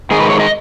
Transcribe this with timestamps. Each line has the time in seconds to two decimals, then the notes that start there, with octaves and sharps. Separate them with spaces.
0.11 G#2 D#3 G#3 G#4
0.20 B4
0.30 C#5
0.40 D#5